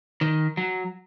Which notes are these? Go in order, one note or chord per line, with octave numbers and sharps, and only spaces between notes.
D#3
F#3